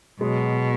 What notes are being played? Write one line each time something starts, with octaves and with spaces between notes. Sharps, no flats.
B2 F#3 G#3